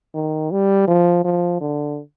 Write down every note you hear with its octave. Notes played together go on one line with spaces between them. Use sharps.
D#3
G3
F3
F3
D3